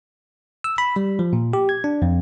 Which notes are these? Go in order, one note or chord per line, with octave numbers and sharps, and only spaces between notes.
E6
B5
G3
F3
A#2
G4
G#6
D4
F2